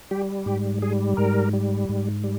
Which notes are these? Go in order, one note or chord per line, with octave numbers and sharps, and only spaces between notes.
G3 G4
G#2 G4
G3 G#4
G#2 A#4
G3
G#2
G3